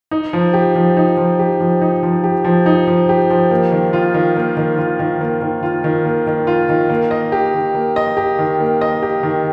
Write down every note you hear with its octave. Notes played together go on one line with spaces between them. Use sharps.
D#4
F3
G4
F3
D#4
F3
G4
F3
D#4
F3
G4
F3
D#4
F3
G4
F3
A#3
D#3
F4
D#3
A#3
D#3
F4
D#3
A#3
D#3
F4
D#3
A#3
D#3
F4
D#3
A#3
D#5
G4
D#3
A#3
D#5
G4
D#3
A#3
D#5
G4
D#3